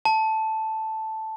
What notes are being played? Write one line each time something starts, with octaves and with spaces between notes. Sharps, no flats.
A5